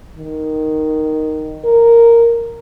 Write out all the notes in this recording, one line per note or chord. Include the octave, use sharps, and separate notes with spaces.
D#3
A#4